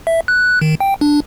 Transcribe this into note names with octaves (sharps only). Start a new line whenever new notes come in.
E5
F#6
D#3
G5
D4